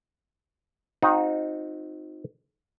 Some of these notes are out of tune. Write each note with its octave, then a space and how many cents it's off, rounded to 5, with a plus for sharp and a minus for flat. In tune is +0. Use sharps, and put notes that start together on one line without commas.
C4 +0 D#4 +0 F#4 -45